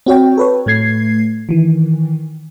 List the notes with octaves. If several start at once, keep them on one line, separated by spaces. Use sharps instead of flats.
C4 F#4 C#5 G5
A4 B4 C#5
A2 A3 G#6 C7
D#3 E3